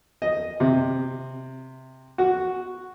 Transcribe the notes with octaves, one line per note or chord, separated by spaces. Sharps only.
D#5
C3
F#4